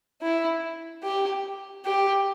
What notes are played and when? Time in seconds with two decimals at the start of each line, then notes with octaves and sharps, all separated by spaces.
0.22 E4
1.03 G4
1.85 G4